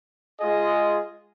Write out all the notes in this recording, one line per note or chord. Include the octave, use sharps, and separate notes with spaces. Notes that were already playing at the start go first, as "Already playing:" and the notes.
G#3 F4 G#4 D#5